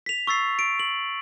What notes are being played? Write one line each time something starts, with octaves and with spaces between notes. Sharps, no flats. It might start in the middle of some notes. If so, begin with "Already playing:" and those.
B6 F7
C#6 E6 A6 C7
D7
F#7